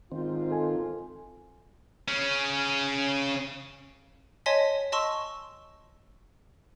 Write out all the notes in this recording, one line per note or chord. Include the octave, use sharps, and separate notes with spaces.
G#1 G#2 D#3 C4 F4
A4 G#5
C#3 C#4
C#5 D#5 G#5 A5 C6 B6
D#5 A5 C6 C#6 E6